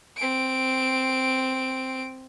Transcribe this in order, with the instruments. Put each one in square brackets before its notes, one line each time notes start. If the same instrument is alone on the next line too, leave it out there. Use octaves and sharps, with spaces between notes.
[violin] C4 D7